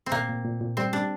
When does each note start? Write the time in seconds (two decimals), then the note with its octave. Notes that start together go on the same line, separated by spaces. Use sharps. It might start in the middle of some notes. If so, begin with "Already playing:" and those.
0.06 C4
0.12 A#2 A#3
0.29 A#2
0.45 A#2
0.61 A#2
0.77 G3 C4
0.93 G3 D4